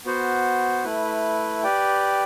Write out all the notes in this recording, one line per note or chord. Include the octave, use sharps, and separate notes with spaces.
B3 F#4 C5
A3 E4 B4
G4 B4 D5 G5